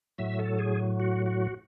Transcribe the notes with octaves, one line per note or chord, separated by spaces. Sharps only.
A2 F#3 E5
A4
G#4
F#4
F#4